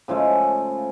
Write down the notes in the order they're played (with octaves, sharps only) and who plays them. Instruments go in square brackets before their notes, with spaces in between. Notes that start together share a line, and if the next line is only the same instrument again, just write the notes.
[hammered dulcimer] C#3 F3 G#3 A3